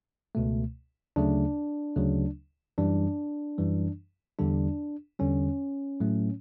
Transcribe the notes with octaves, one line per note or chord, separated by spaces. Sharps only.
C#2 B2 A3
D2 C#3 F#3 A3 D4
D2 C#3 F#3 A3
F#2 E3 G3 D4
F#2 E3 G3
E2 D3 G3 D4
E2 D3 G3 C#4
A2 F#3 A3